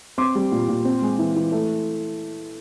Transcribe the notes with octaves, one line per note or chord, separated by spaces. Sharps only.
C4 C6 D6
G3
A#2
A#2
C4
G#3
E3
E3
A3